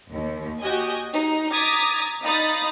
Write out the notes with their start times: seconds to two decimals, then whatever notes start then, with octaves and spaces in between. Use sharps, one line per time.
0.13 D#2
0.60 F#4 G4 D#5 G#5
1.12 D#4
1.51 A#5 D6 D#6 G#6 A6 B6
2.22 D#4 F5 A#5 B5 D#6 A6